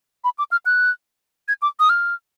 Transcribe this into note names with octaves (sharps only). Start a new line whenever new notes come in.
B5
D6
F6
F#6
G#6
D6
D#6
F6